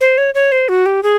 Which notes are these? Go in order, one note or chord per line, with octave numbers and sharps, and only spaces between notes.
C5
C#5
C#5
C5
F#4
G4
G#4